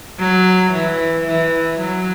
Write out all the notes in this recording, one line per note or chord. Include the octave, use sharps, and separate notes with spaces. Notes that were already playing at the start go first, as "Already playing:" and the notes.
F#3
E3
E3
F#3